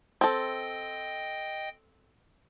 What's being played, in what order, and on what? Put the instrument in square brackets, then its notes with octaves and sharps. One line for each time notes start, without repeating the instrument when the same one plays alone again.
[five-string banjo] C4 A4 [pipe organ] D#5 G5